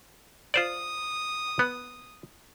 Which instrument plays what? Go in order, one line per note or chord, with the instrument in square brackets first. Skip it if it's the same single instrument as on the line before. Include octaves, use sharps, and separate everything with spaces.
[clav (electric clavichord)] F4 C5 D5 [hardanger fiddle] D#6
[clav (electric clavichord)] B3